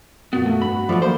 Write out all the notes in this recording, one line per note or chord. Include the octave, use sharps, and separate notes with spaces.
F2 A#2 A#3 B3 F#4
A3
G2 B5
F3 F#3 A3 D5 E5
D#3 A3 A#3 C5